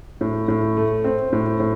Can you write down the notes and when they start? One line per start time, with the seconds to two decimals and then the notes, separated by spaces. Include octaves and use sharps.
0.21 A2
0.48 A2
0.77 A3
1.04 C4
1.33 A2
1.60 A2